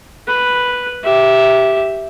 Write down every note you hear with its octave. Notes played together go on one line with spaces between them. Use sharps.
B4
G4 E5